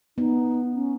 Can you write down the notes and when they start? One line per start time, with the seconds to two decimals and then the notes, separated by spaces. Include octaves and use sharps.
0.18 B3 D#4
0.73 C#4